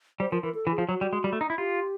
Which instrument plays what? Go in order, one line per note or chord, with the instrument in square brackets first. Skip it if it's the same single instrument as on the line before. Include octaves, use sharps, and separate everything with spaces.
[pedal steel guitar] G3 [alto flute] C5
[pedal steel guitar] F3 [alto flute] A#4
[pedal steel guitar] E3 [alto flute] A#4
[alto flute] A4
[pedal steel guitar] E3
[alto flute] G#4
[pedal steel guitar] F3
[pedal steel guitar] F#3 [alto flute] F#4
[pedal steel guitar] G3
G#3
G3
A3
D#4
E4
[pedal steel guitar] F4 [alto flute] G4